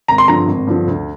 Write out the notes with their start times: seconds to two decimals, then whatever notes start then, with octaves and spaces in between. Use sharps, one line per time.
0.08 G#1 A#5
0.18 C6
0.28 G2 D3 F3 A#5
0.47 G#1
0.67 G2 D3 F3
0.87 D2